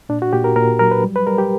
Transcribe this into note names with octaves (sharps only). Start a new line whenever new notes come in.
A#2 D4
F#4
A#2 G4
A#4
A#2 A#4
F#3 A#4
B4
G3
B4
G3 A#4
G4